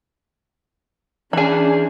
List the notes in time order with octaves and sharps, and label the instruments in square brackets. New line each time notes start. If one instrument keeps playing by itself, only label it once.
[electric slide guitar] E3 G#4 [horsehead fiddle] C#4 [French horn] D4 [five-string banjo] G#5 B5